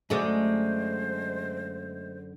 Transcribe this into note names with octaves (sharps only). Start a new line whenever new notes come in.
F#2 D3 G#3 A3 C5 D5